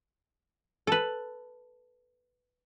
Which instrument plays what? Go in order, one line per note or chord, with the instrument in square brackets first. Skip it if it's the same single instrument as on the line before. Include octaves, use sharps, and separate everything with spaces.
[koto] A4 B4